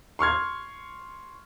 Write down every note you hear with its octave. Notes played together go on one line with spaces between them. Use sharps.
C6 C#6 F6 G#6